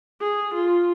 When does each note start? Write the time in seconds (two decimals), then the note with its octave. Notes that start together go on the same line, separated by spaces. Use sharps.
0.21 G#4
0.54 F4